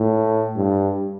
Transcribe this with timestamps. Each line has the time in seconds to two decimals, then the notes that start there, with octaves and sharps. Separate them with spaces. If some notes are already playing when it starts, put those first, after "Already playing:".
Already playing: A2
0.56 G2